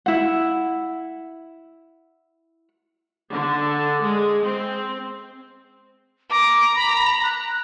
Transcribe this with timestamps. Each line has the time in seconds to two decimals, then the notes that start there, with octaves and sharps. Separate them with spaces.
0.06 E4 F#5
3.32 D3
4.03 G#3
4.46 C4
6.31 A#5 D6
6.75 B5
7.23 F#6